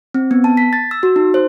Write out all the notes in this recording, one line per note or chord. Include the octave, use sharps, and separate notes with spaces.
C4
B3
A5
B6
A6
E6
F#4
D#4
C5